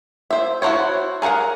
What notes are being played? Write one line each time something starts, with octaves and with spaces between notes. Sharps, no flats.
C5 E5
E4 F#4 A#4 C5 C#5
G#4 A#4 F5 F#5 A#5